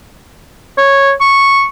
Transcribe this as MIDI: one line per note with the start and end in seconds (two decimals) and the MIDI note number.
0.78 1.12 73
1.21 1.65 85